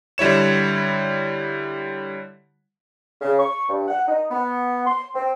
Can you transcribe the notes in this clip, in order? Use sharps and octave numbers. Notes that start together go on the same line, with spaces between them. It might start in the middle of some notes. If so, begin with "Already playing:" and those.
D3 G3 E4 C#5 E7
C#3
C#6
G2
F#5
D#4
B3
C6
C4